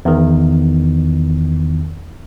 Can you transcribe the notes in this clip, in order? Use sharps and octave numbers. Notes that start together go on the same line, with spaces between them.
E2 D#3